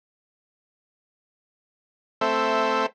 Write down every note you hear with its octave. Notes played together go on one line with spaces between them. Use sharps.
A3 C4 A4 C5 E5